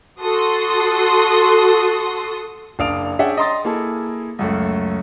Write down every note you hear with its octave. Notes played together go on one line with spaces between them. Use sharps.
F#4 A4 C6 D#6
F#1 D4 F5 D#6 D7 F7
C#4 D4 G#4 E5 F#5 G5
D#5 A#5 C6 D#6 A6
A#3 E4 G#4 A4
C#2 F#2 A3